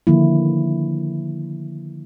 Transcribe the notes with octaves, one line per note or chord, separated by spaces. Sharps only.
D3 D#3 F3 A#3 E4